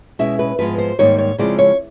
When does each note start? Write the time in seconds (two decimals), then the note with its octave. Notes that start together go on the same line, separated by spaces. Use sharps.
0.19 B2 G#3 C#4 E4 E5
0.39 B4
0.59 G#2 F3 G#3 B3 B4
0.78 C5
0.99 G#2 D#3 G3 A#3 D#4 C#5
1.18 C#5
1.38 C#3 F3 G#3 C4 E4 D5
1.59 C#5